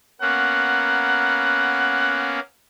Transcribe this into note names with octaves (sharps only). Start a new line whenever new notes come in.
A#3 B3 C#4 F#5